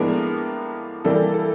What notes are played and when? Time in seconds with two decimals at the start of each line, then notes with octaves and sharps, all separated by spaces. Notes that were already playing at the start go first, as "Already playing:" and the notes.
Already playing: A2 F3 G#3 A#3 B3 D4 A#4
1.05 E3 G3 A#3 A4
1.34 A4